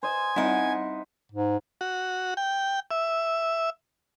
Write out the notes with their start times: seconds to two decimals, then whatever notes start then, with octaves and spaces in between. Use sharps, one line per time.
0.03 C5 D#5 G#5
0.36 G3 C4 C#4 D#4 E4 F#5
1.32 G#2
1.81 F#4
2.37 G5
2.91 E5